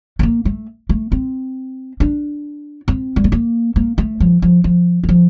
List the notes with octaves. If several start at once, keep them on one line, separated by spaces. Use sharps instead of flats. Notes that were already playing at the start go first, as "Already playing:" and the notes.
A3
A#3
A3
A3
C4
D4
C4
G3
A3
A#3
A#3
A3
F3
F3
F3
D#3
F3